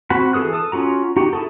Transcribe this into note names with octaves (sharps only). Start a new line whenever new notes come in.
C4 F#4 F#5 B5
E3 G#4 A4 D#6 F#6
A4 D#6
C#4 F4 F#4 A#5
D#4 F#4 G4
E4 G#4 A4